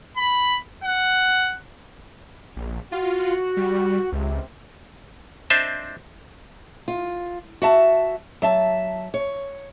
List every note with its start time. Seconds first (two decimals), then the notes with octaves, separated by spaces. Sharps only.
0.17 B5
0.84 F#5
2.56 A#1
2.92 F4 F#4
3.57 G3
4.12 C#2 C3
5.50 C4 D4 C5 D#5 E5 A5
6.88 F4
7.62 F#4 E5 A5
8.42 F#3 E5 A5
9.14 C#5